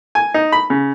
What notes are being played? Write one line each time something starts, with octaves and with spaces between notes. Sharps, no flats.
G#5
D#4
B5
C#3